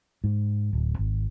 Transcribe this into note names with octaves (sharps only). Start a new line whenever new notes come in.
G#2
D1
G#1